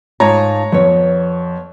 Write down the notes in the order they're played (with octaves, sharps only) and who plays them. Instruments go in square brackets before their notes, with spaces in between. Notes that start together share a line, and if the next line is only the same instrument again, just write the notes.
[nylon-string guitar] G#2 F4 A5 [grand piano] C#5 A#5
[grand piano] F2 [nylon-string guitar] B3 C#5